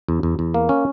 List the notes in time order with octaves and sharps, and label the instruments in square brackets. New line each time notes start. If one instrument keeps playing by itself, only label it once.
[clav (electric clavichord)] E2
E2
E2
A#3
C#4